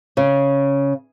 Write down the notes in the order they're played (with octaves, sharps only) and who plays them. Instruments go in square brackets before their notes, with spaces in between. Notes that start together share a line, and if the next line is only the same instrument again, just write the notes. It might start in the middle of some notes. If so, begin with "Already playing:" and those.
[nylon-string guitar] C#3